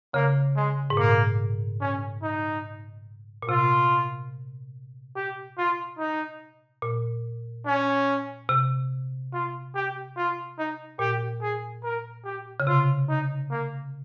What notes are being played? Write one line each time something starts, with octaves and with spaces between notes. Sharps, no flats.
C#3 A#3
G#3
G#2
A#2 A#3
C#4
D#4
A#2
C3 F4
G4
F4
D#4
A#2
C#4
C3
F4
G4
F4
D#4
A#2 G4
G#4
A#4
G4
C#3
C3 F4
D#4
A#3